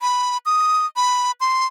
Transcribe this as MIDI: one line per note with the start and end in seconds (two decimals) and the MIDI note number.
0.02 0.38 83
0.46 0.86 87
0.96 1.32 83
1.41 1.66 84